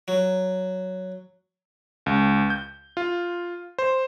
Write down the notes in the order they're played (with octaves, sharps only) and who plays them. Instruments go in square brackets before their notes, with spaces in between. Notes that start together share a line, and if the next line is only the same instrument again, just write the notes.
[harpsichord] F#3
[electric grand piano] C#2
G6
F4
C5